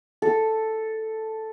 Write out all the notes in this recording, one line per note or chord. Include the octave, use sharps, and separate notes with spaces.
A4